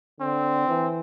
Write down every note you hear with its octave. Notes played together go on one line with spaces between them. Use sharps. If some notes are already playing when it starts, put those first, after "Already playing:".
D3 C4
E3